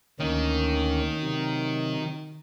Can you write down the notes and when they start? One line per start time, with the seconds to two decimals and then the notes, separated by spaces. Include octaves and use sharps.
0.20 D2 D#3 A#3 C#4
1.23 C3 F#3